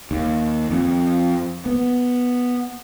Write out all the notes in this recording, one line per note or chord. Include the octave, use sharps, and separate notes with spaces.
D#2
F2
B3